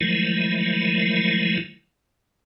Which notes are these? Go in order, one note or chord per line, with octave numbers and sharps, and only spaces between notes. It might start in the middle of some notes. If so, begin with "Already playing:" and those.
D#3 F3 F#3 G#3 A3 E4